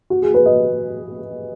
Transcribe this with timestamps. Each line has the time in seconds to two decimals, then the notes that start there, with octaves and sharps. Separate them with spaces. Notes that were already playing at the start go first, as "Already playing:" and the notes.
0.10 F#4
0.22 G#4
0.34 B4
0.46 D#5